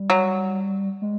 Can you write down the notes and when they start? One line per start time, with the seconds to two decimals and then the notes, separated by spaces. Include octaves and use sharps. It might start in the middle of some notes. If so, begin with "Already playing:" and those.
Already playing: G3
0.10 F#3
1.02 G#3